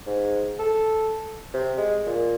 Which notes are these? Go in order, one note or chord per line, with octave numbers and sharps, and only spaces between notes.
G#2
A4
C3
G#3
A#2